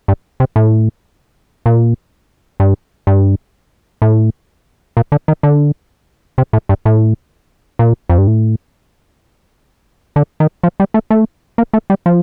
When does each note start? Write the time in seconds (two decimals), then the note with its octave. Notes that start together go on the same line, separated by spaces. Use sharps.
0.08 G2
0.40 C3
0.56 A2
1.66 A#2
2.60 G2
3.07 G2
4.02 A2
4.97 A#2
5.12 D3
5.28 D#3
5.43 D3
6.38 C3
6.53 A2
6.69 G2
6.85 A2
7.79 A#2
8.09 F2
8.18 G2
8.27 A2
10.16 D3
10.40 D#3
10.63 F3
10.80 G3
10.94 A3
11.10 A3
11.58 A#3
11.73 A3
11.90 G3
12.06 F3